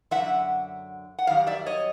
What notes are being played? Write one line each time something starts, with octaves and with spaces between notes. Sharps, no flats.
F#2 D3 F3 E5 F#5
F#5
F#2 D#3 G3 F5
D5 E5
C#5 D#5